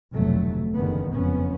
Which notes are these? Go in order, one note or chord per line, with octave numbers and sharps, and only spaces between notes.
F1 D2 B2 F#3 A3
F#1 E2 D3 D#3 B3
F#1 F2 G#2 B3 C#4